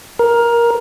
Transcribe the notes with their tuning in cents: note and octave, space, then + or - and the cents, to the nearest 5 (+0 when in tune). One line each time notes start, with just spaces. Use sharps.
A#4 +15